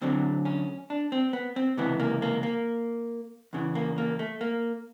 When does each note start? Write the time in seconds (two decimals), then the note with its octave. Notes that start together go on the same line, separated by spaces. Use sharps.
0.01 D2 D3 F#3 C4
0.45 C#4
0.90 D4
1.12 C4
1.33 B3
1.56 C4
1.77 C#2 C3 E3 B3
2.00 A#3
2.22 A#3
2.43 A#3
3.53 E2 C#3 E3
3.75 A#3
3.98 A#3
4.19 A3
4.41 A#3